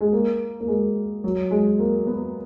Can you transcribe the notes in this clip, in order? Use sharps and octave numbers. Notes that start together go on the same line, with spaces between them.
G#3
A#3
A#3
G#3
F#3
G#3
A#3
B3